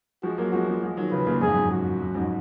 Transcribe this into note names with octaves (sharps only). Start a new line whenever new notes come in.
F3 G#3 F#4
F#3 A#3
F3 G#3 F#4
F3 G#3
F3 G#3
D#3 F#3
C#3 F3 B4
A#2 C#3
F2 G#2 G#4
F#2
F2 G#2
F#2 F#4
F#2
F2 G#2